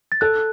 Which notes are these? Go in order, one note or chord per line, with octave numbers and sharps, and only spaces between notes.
A6
A4 F#6